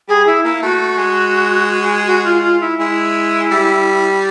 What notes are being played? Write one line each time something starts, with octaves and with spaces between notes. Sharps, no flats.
G3 G#4
E4
A#3 E4
A3 F#4
G#3
F#4
F4
F4
E4
G#3 E4
G3